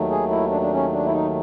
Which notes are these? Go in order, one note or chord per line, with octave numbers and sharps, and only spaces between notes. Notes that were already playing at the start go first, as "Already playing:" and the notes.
Already playing: D#2 D#3 F#3 A3
G#4
E4
D4
D4
C#4
D4
E4
D#4